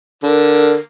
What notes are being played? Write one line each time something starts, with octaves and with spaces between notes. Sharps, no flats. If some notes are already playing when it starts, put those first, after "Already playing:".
D3 A#4